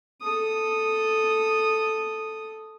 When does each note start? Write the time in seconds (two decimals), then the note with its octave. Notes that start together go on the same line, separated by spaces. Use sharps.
0.21 A4 D#6